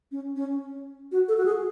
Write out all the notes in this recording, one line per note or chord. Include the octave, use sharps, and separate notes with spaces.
C#4
C#4
F#4
A4
F#4
G#4